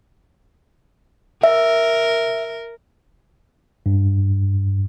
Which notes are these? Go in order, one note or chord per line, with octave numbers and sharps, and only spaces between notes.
A#4 E5
G2